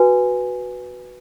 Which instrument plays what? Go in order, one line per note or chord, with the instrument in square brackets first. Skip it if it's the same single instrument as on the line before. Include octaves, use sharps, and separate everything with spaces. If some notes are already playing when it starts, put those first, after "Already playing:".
Already playing: [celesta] F#4 B4 G#5